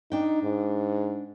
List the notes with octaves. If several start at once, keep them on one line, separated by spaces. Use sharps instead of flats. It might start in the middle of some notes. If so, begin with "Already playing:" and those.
D4 D#4 G5
G#2